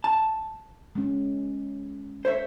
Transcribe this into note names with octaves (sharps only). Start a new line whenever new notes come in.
A5
G#3 C#4
C5 C#5 E5